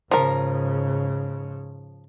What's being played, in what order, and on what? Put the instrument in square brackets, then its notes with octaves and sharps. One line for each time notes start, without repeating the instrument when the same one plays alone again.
[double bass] G#2 C#3 [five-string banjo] F3 A#4